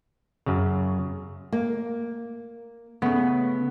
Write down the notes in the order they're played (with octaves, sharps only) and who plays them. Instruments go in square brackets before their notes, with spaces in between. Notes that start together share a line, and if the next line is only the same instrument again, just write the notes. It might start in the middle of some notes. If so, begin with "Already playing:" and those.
[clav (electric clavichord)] F#2 C#3
[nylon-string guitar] A#3
[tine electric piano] C#3 A3 [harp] B3